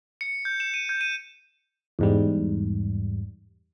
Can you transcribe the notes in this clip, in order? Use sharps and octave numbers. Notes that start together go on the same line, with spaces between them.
C#7
G6
E7
D#7
G6
D#7
E2 G#2 G3